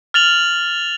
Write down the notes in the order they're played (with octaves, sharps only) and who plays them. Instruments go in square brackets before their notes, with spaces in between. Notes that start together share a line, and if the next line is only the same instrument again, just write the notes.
[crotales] F6 A6 F7 F#7